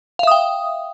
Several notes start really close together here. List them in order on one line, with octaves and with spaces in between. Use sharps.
F5 E5 D#6 G5